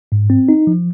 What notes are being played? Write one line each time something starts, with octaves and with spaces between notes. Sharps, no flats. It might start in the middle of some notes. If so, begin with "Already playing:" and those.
G#2
C4
D#4
F3